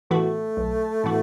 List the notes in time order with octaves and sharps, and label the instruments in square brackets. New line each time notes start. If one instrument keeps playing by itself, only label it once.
[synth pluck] A2 E3 B3 F#4 [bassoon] A3
[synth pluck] B1
A2 E3 B3 F#4